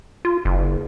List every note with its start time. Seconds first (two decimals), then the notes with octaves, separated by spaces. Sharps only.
0.25 F4
0.45 F#1